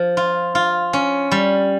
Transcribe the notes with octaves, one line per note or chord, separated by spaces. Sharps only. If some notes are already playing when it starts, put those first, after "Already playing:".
Already playing: F3
F4
F4
C#4
G3